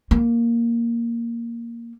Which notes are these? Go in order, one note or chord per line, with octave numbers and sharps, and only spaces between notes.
A#3